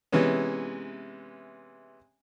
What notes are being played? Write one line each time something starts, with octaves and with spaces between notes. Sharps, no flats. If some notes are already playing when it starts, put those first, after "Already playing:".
C3 E3 G#3 B3 C#4